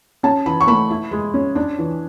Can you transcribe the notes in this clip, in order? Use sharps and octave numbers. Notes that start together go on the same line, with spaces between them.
C#4 A5
E3 B5
C#6
A3 B5
E4
G#3
C#4
D4
E3